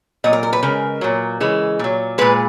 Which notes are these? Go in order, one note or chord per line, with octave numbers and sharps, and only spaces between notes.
A#2 F#3 D#5
A#4
A#4
B4
C#3 G#3 A#4
A#2 F#3
C#3 E3 G#3
A#2 F#3
A#2 G#3 B4